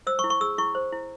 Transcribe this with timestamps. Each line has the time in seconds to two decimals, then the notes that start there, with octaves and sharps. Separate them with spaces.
0.07 C5 E6
0.19 C#6
0.24 E4
0.30 C#6
0.41 G#4 E6
0.58 E4 C#6
0.75 C5
0.93 E4